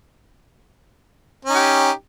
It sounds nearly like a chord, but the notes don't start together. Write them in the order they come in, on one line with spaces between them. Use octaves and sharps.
C#4 D#4 G4